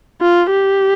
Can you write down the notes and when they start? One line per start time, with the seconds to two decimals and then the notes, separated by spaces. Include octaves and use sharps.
0.21 F4
0.51 G4